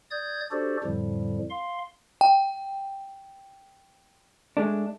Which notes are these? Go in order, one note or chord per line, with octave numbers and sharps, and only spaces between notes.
D5 D#6 G6 G#6
D4 F#4 G4 A4 C5 D5
F2 A2 D3 F3 G3
F5 C6
G5
G#3 A3 D4